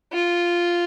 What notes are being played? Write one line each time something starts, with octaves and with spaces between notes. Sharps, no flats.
F4